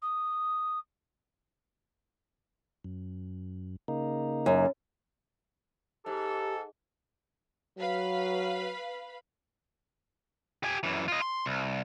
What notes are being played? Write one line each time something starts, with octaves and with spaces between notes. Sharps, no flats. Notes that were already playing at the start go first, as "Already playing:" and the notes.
D#6
F#2
C#3 A#3 D#4
F#2
G#2 G4 A4
F#3 B4 F5 B5
G4 G#5
F#2 E3
F4 D#5
C6
C2